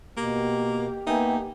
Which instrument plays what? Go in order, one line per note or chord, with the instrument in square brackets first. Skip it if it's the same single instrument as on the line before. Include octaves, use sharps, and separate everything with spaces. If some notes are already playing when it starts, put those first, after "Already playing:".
[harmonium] B2 [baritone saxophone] A#3 [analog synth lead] G4
[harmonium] A#3 B3 [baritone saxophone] D#4 [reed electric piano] E5 G5 G#5